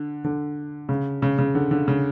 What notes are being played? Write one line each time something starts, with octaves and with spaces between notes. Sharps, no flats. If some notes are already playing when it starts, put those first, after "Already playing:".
Already playing: D3
D3
C#3
C#3
C#3
D3
D3
C#3